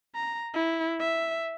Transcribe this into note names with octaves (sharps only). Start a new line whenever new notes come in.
A#5
E4
E5